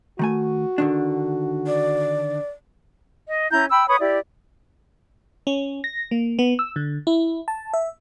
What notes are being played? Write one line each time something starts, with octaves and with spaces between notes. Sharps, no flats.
D#3 A3 F#4 G#5
D3 D#3 D4
D5
D#5
C#4 E4 A#5 G6
G5 B5 E6
B4 C#5 B5 D#6
E4 G4 D5
C#4
A#6
A#3
B3
E6
D3
E4
A5
E5